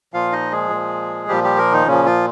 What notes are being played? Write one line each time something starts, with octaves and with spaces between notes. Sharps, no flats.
A#2 F3 F4 F5
D#4 D#5
G#3 G#4
A#2 F3
A#2 F3 G3 G4
G3 G4
A#3 A#4
D#3 D#4
A#2 C#3 F3 C#4
F3 F4